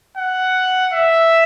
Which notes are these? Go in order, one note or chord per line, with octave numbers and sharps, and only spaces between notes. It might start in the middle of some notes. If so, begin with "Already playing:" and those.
F#5
E5